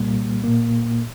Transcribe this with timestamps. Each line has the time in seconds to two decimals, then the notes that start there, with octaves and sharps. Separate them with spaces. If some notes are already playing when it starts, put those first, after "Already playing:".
Already playing: C2 A#2 G3 A#3
0.44 A#2 A#3